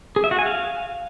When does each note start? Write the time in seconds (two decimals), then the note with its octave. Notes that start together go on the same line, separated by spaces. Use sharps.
0.16 G#4
0.24 E5
0.31 F#4
0.39 G#5
0.46 F5